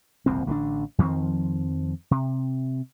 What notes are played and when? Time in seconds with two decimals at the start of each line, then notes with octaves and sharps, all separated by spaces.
0.26 D#1 C2 F2 C4
0.47 A1 D3 F3 D4
0.98 F2 D#3 F3 C4
2.11 C3